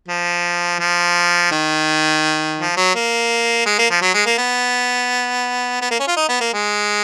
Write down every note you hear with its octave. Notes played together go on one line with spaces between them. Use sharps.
F3
F3
D#3
F3
F#3
A#3
G#3
A#3
F3
F#3
G#3
A#3
B3
B3
A#3
C#4
F4
D#4
B3
A#3
G#3